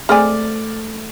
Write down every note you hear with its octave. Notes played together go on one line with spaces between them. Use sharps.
G#3 A3 C4 D5 G#5 F6